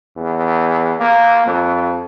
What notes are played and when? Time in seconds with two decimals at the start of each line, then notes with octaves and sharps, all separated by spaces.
0.17 E2
1.00 A#3
1.46 F2